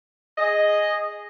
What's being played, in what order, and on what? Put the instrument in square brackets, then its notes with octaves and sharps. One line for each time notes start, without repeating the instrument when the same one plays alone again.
[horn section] G#4 D#5